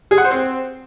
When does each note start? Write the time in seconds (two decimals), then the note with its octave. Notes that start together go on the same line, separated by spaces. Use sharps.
0.11 G#4
0.18 F#5
0.24 C5
0.31 C4